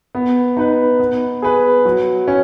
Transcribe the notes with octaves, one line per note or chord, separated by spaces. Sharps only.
B3
D#4 B4
B3
G#4 B4
F#3
C#4